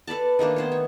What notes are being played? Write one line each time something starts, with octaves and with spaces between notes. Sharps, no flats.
A4 B4 D5 A5
D#3 A3 A#3 D4
B3 C5 C#5
C#5